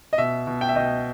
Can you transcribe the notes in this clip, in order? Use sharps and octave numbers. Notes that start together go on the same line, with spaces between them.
D#5
B2 E5
B2
G5
E5
B2 D#5 G5